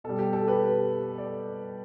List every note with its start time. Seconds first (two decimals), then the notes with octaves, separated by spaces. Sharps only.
0.04 B2 G3 A4
0.19 G4
0.33 A4
0.47 G4 B4
1.18 A4 D5